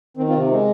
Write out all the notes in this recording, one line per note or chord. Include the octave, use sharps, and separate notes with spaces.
D#3 C4
C4 F4
C3
G#3 C4